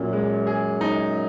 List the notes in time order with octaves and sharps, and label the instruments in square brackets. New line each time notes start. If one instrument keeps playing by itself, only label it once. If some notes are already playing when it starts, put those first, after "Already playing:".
Already playing: [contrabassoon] F#2 [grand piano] A#2
[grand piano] G#3
G#4
D#4